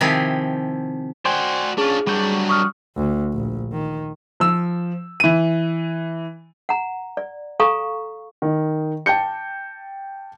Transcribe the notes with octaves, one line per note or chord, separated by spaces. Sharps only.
C3 D#3 F3 E4 G4 G#4
F#4 C5 D5 G5 G#5
C#4 D4 F4 G#4
F#3 G3 D4 F#4 G6
C#6 D#6 F6
D2
A#1
D#3
F3 E6
E3 D#7
F#5 A#5
D5
A4 F5 G#5 A#5 C#6
D#3
G5 A5 G6 C#7